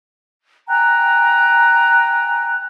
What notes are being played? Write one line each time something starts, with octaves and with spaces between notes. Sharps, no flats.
G5 G#5 A#5 F#6